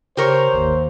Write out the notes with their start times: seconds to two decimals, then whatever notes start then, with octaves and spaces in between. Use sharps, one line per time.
0.17 C#3 G4 A#4 C5 C#5
0.53 G1 D#2